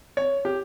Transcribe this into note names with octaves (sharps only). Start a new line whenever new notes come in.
C#5
G4